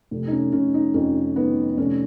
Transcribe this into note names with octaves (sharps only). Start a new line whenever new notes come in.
F1
D#4
C#4
F1 C#4
D#4
F2 C#4
D#3 B3
F1 C#4